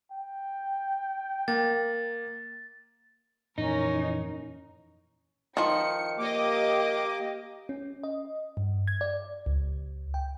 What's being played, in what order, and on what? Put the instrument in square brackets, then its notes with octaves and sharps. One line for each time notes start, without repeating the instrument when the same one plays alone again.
[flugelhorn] G5
[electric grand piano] A#3 [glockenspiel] A6
[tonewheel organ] F2 A#2 E3 [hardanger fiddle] C#4 A#4 [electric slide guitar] D#4
[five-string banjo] D#3 F3 [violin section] C#7
[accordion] A#3 D6 [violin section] G4 D#5
[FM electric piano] C#4
D#5
G2
G#6
D5
C#2
G5